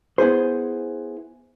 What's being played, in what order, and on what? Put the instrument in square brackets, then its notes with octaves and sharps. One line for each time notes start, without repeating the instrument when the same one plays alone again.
[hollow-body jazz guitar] B3 E4 G#4 C5